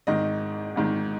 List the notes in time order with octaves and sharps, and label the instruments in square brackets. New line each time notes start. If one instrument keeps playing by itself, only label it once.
[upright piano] G#1 G#2 D#3 D#5
G#1 G#2 D#3